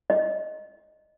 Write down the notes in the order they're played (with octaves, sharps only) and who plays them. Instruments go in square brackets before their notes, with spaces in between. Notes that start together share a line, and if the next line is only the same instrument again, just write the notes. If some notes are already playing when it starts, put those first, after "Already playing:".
[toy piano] D#5